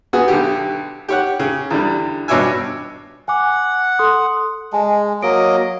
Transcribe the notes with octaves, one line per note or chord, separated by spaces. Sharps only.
B3 F#4 G#4 D#6
B1 D3 G4
G4 C#5 F#5
C#3
E2 D3 G3
G2 B2 C#5 D5 E5 G#5
F#5 G#5 D6
A4 C6 D#6
G#3 D#5 G#5 A5
F#3 A#3 D#5 D7